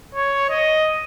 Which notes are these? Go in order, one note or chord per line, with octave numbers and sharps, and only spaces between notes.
C#5
D#5